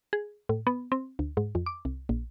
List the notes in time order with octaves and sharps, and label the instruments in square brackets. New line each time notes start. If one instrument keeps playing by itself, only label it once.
[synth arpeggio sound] G#4
A2
B3
C4
D2
G#2
F2
D6
C2
A#1